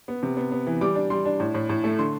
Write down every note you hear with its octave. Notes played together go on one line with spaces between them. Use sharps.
B3
C3
B3
B3
E3
G3 D6
D4
G3 C6
D4
A2
A2
A2
A3
D3 C6